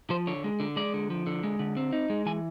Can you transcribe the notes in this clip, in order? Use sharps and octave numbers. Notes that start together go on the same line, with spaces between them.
F3 C5
D3 C#5
G#3
D3
G#3 D5
D3
F3
D3
G#3
D3
C4
D#4
G#3
E3 G#5